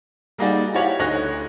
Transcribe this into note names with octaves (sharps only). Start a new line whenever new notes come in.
G3 A#3 D#4 F#4 G#4 D5
E4 F#4 G4 C#5 F5 F#5
D2 D#4 C#5 F#6 A#6